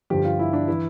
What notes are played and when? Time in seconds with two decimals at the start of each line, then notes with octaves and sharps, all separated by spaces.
0.10 G2 D3 F3 G4
0.25 F4
0.39 E4
0.53 D4
0.68 E3 E4